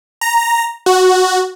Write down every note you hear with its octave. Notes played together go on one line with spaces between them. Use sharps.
A#5
F#4